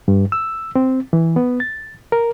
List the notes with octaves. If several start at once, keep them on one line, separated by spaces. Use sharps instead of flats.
G2
E6
C4
E3
B3
A6
A#4